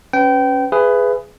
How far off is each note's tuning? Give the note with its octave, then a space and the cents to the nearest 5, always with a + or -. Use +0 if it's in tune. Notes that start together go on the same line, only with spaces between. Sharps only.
C#4 +0 B4 +25 G5 -25
G#4 +0 B4 +15 E5 +35